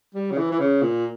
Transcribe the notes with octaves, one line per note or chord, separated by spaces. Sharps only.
G3
C#3
E3
E3
C#3
A#2